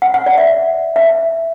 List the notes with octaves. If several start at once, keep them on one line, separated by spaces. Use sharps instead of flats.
F#5
F#5
D5
E5
E5